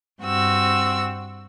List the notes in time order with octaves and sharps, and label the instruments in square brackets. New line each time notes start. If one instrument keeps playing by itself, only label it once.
[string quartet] G2 C4 F#4 E6